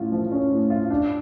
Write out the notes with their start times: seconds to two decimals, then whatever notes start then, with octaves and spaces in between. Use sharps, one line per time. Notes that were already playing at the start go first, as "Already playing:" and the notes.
Already playing: A2 C#4 F4
0.12 F3
0.32 C#4
0.51 A2
0.70 F4
0.90 D4